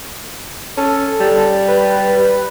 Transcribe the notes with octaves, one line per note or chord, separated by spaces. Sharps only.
C#4 A4
G3
B4